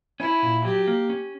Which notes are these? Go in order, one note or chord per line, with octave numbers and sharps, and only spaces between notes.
C#4 E4
A#2
F#3 G4
A#3
C#4